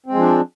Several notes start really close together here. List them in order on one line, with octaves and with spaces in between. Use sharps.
C4 G#3 F3 D4